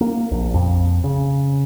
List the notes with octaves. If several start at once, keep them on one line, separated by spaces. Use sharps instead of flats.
A#3
A#1
F2
C#3